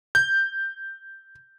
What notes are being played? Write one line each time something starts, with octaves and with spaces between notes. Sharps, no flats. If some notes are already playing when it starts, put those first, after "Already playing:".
G6